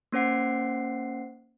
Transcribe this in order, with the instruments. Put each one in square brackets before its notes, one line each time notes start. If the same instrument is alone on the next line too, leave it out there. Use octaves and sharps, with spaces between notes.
[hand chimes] A#3 C#4 C5 F#5 C7